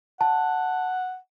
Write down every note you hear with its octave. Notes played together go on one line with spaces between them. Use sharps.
F#5 A5